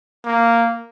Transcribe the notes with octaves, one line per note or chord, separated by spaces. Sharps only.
A#3